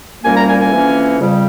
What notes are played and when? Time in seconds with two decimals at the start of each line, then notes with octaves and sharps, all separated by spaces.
0.23 C2 A#2 G3 A#3 C#4 G#5
0.36 A#5
0.47 G#5
0.59 G#5
0.72 F2 E3 A#3 C#4
1.20 F2 C#3 G3